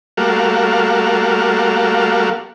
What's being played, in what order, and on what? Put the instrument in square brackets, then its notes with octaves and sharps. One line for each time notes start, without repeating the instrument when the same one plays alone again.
[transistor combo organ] G3 A3 A#3 F#4 F5